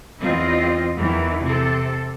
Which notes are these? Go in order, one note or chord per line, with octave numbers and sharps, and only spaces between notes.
E2 C4 F4 D#5
E2 D#3 E3
C3 A4